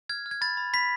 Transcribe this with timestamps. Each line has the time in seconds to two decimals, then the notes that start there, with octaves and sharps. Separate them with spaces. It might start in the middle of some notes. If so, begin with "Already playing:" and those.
0.09 F6 G#6
0.26 F6
0.31 G#6
0.41 B5 A6
0.57 B5
0.73 B5 B6